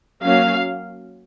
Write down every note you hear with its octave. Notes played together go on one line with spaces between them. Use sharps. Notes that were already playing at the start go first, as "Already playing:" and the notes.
F#3 A#3 C#4 F5